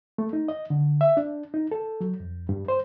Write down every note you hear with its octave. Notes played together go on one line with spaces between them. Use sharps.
A3
D#4
D#5
D3
E5
D4
D#4
A4
F#3
F2
G2
C5